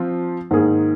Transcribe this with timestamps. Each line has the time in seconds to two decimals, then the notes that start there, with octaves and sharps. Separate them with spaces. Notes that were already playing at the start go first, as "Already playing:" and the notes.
Already playing: F3 C4 F4
0.51 G#2 D#3 A#3 G#4